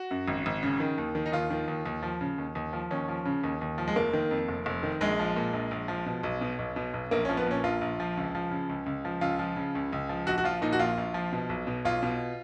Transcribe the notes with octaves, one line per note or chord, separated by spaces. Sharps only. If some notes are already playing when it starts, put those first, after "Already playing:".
Already playing: F#4
F#2
G#1
G#1
C#3
D#3
D#2
D#3
D#4
D#2 F4
D#3
D#2
D#2
F3
C#3
D#2
D#2
F3
D#2 C#4
F3
C#3
D#2
D#2
F3
G#3
F1 A#3
D#3
F2
F1
F1
D#3
A#1 G#3
F3
A#2
A#1
A#1
F3
B2
B1
B2
B1
B2
B1
A#1 A#3
F3 C#4
B3
A#2 C#4
A#1 F4
A#1
F3
C#2
F3
C#3
C#2
C#2
F3
C#2 F4
F3
C#3
C#2
C#2
F3
A#1 F#4
F#4
F3 F4
A#2 D#4
F#4
A#1 F4
A#1
F3
B2
B1
B2
B1 F4
B2